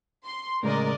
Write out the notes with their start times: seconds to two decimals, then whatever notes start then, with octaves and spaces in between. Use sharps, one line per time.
0.25 C6
0.63 A2 C#3 G#3 A#4 D5 D#5